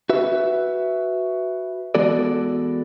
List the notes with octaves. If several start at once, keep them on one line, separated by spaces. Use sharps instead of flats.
F#4 B4 E5
E3 G#3 B3 F#4 A4 D5